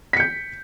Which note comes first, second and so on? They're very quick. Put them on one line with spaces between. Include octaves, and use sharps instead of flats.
B6 C#7 G6